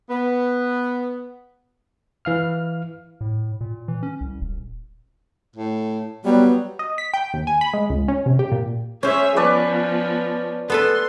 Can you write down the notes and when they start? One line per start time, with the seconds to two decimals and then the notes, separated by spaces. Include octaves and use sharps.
0.09 B3
2.25 E3 F5 F6
3.21 A2
3.61 A#2
3.88 E3
4.03 C#4
4.21 C2
4.41 D#1
5.56 A2
6.25 F#3 G3 B3
6.79 D#5
6.98 B6
7.14 G5
7.34 D#2
7.47 G#5
7.61 B5
7.73 G#3
7.90 C#2
8.08 C#4
8.26 C3
8.39 G4
8.52 A#2
9.03 C#4 G#4 C5 C#5 E5
9.36 F3 B3 B4 D5 A5
10.70 B3 A4 B4 C6